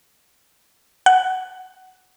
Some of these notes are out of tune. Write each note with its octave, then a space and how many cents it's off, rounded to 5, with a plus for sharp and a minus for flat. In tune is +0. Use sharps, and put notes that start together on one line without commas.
F#5 +10